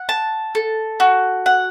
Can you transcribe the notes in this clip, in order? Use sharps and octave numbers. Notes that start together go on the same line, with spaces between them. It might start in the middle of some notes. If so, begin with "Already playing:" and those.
Already playing: F#5
A5
A4
F#4
F#5